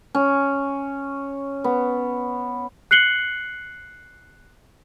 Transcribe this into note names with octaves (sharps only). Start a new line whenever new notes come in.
C#4
B3
F#6 C7 C#7 F#7 G7